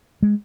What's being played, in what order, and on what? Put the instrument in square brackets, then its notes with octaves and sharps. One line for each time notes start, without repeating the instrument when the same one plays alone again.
[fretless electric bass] G#3